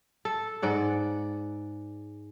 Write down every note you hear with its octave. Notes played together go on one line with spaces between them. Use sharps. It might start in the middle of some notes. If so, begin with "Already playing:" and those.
A4
G#2 D5 F#5